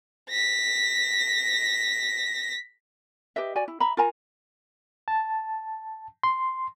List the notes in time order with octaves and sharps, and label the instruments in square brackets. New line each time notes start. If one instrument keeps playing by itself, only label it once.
[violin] A#6 B6
[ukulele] G4 B4 D#5 E5
F#4 D5 G#5
E4
E5 A#5 B5
F4 A#4 G#5 A#5
[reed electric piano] A5
C6